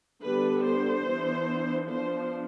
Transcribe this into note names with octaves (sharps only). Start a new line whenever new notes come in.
D3 G3 B3 D4 B4
C5
E3 B3 D4
F3 B3 D4 C5